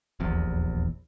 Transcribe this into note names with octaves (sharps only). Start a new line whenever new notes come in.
D#1 A#1 E2